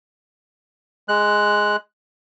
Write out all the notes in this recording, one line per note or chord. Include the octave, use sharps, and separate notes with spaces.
G#3 F#6